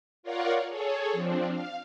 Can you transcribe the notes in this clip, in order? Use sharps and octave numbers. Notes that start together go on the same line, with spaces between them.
F4 A#4 C#5 D5 F5 F#5
G#4 A4 C#5
F3 C4 D4
F5